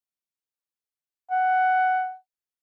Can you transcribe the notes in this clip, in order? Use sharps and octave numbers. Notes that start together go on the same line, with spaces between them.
F#5